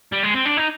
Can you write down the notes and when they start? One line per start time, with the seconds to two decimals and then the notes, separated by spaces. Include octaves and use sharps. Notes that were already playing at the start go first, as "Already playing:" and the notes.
0.12 G3
0.23 G#3
0.35 C4
0.46 D4
0.57 D#4